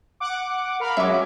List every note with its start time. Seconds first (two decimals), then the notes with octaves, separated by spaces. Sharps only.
0.20 F#5 D6
0.80 A#4 F5 B5
0.97 F#3 G#3 C#4 E5 D6